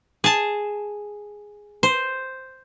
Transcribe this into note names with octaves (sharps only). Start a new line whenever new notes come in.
G#4 A5
C5